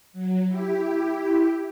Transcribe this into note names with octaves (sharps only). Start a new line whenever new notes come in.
F#3
E4 G4